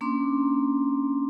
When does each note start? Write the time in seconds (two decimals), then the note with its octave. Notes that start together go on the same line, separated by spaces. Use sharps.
0.01 A#3 C#4 D4 C6 D6